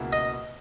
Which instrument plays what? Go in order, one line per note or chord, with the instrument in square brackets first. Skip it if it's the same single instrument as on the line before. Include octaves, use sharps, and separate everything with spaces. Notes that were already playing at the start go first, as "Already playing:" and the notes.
Already playing: [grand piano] C#2 B2 A#3 E4 G#4
[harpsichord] D#5